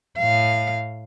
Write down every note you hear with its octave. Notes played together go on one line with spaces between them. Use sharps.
A2 F5